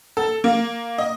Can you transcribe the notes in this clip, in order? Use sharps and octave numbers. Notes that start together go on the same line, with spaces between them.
A4
A#3
D#5